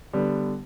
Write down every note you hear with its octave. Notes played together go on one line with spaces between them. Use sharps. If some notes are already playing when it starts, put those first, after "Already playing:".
D3 G3 B3